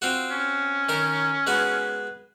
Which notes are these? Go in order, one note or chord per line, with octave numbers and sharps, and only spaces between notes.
C4 F4 F#4
C#4
D#3 A#4
G#3 B3 F#4